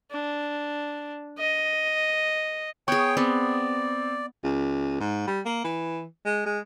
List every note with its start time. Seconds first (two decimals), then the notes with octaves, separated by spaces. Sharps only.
0.11 D4
1.38 D#5
2.88 B3 G#4 C#5 G5 C#6
3.17 B3 C4 D5
4.44 C#2
5.00 G#2
5.27 G3
5.45 A#3
5.64 E3
6.25 G#3
6.46 G#3